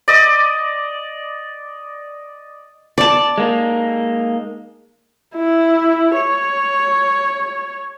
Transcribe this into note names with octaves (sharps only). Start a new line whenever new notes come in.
D5 D#5
D5 A5
G#3 A#3 D#4
E4
C#5